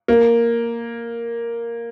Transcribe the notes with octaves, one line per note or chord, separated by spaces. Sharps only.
A#3